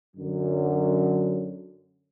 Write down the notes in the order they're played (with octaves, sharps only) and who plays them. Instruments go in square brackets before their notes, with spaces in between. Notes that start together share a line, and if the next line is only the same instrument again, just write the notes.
[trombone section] F#2 D3 F#3